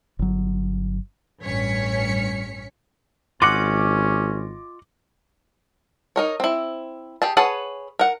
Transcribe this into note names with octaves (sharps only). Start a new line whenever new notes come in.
G1 F#3
A1 G2 C#4 C#5 B6 C#7
G#1 C#4 F4 D#5 F#5 D6
D#4 A#4 C#5
C4 E4
G4 G#4 A5
G#4 B4 C#5 F#5 A5
A#4 F#5